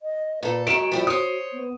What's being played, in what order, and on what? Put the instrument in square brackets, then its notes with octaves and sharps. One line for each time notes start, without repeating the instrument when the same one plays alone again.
[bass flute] D#5
[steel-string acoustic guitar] A#2 A4 [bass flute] B4
[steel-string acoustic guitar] D#3 F#3 G#3 [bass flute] F#4 [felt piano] D7 E7
[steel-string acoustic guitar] F3 G3 E4
[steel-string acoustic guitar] C5 C#5 [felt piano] D#6
[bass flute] B3